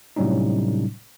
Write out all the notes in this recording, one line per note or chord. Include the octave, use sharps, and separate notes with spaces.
A2 C3 F#3 G3 C#4 D#4